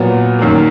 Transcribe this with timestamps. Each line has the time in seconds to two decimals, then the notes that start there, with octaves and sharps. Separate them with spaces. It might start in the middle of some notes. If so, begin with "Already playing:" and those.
Already playing: A#2 F#3 B3
0.39 F#2 D#3 A#3